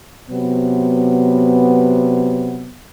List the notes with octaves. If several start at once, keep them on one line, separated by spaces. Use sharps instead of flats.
C3 F#3 B3